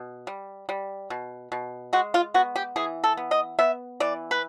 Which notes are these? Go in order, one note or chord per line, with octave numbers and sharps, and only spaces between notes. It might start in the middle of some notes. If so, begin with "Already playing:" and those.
Already playing: B2
G3
G3
B2
B2
G#3 F#4
F4
B3 F#4
G4
E3 G#4
A4
B3
D#5
B3 E5
E3 D5
B4